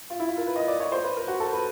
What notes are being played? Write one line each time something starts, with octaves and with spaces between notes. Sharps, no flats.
F4
E4
F4
A#4
B4
D#5
D5
C#5
C5
B4
A#4
F#4
A4
B4